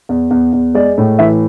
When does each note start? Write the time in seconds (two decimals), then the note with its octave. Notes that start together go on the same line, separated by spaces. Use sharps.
0.09 E2
0.31 E2
0.53 E2
0.74 G#3 D5
0.98 A2
1.19 E3 E5